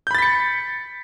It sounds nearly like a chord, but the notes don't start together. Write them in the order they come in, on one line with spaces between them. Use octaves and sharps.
G6 B5 A6 B6 C#7